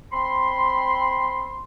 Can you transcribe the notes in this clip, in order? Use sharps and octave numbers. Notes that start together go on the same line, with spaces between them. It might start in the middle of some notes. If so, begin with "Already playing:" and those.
C4 B5 C6